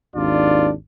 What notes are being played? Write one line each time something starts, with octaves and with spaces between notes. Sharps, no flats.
G#1 D#2 D4 F4 D5